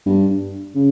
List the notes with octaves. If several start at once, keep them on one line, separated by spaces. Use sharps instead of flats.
G2
C#3